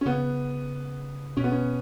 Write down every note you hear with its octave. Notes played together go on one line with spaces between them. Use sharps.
C#4
C#3 B3
B2 C#4
B3
C#4